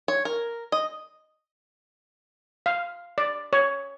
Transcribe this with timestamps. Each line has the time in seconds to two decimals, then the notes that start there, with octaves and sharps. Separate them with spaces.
0.08 C#5
0.25 A#4
0.72 D#5
2.66 F5
3.18 D5
3.53 C#5